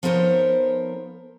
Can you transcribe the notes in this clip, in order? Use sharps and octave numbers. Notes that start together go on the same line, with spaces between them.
F3 B3 D#4 A#4 C5 C#5